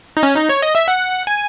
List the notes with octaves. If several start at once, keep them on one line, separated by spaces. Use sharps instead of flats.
D#4
C#4
D#4
C#5
D#5
E5
F#5
G#5